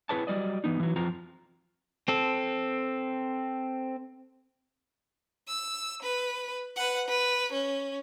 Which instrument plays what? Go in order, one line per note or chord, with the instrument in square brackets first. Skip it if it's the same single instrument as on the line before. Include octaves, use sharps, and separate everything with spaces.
[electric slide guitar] C4 E4 G#4 B4 C#5 A5
F#3 G3 D5 D#5
E3 B3 D#4
E3 F#3
F2 F3 C4 F4 A#5
[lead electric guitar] C4 A4
[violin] E6
B4
B4 F#5
B4
C#4